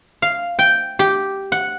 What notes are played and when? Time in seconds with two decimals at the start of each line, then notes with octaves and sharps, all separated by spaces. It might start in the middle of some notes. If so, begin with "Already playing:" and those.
0.22 F5
0.59 G5
0.99 G4
1.52 F#5